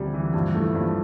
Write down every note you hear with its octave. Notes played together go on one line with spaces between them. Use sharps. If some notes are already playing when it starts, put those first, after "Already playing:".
Already playing: D2 C3 F3 G3
E3
G2 F3
E3 A3
G2 F3